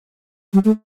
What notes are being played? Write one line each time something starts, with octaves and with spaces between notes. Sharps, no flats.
G3
A3